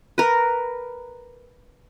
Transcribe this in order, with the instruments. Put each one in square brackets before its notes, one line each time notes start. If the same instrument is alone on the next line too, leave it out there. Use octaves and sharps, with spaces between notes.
[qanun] A#4 B4